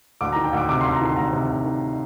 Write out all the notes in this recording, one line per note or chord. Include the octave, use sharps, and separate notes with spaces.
D2 D6
D#3 A#5
G5
D2 D6
C3 D6
D2 C6
A#5
D#3 C6
D2 A#5
C3
D2
D#3